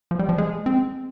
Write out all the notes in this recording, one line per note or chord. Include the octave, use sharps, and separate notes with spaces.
F3
G3
F3
G#3
C4